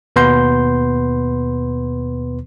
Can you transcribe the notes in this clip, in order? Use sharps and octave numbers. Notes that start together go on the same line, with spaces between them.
D#2 B2 B3 B4 C6 G6